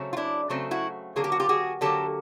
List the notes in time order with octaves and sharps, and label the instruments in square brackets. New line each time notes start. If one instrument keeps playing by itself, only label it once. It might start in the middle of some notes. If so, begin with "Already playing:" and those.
Already playing: [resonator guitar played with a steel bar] C#3 F#3 A3 C4
F4
D4 E4
C#3 F#3 A3 C4
E4 F#4
D3 F#3 A#3 G#4
G4
F#4
F4 G4
F#4 G#4
D3 F#3 A#3 G4 A4